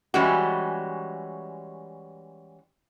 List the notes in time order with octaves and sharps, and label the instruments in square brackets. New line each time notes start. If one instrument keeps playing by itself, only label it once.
[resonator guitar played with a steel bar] E3 G3 G#3 C#4 F#4